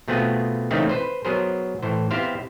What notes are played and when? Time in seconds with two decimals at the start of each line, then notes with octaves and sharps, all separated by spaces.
0.08 B2 A3 B3 C4 F4 G#4
0.71 C#3 E3 A3 A#3 C4 D#4
0.89 B4 C5
1.25 F#3 B3 G#4 A#4 C5
1.82 A2 E3 C5
2.11 B3 C4 E4 G4 C5 F5